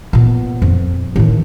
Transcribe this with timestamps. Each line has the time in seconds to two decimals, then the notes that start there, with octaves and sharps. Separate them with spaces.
0.13 A#2 B3
0.62 F2
1.16 A1 D#3